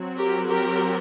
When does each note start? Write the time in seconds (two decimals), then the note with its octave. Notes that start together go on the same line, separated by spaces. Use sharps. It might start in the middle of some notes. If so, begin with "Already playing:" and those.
Already playing: F#3 C4
0.17 G4 A#4
0.48 G4 A#4